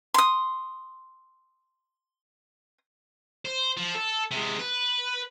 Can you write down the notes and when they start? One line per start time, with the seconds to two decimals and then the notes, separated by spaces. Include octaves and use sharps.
0.14 C6 D#6
3.45 C5
3.77 F3
3.95 A4
4.31 C3 G#3
4.59 B4